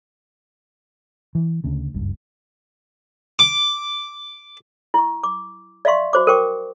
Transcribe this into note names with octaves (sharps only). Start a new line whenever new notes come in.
E3
D2 C#3
F#1 C#2 G2
D6
E4 C#6
D6
D5 E5 F5 C6 C#6
F#4 C5 D6
A#4 C5 G5 C#6 D6